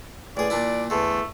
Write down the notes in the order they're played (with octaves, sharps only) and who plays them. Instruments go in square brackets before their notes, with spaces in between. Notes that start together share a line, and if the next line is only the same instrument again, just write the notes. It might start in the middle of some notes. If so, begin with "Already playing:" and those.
[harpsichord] A1 G#4 [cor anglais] D5
[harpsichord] A#2 D4 E4
[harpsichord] E2 D3 [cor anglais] A3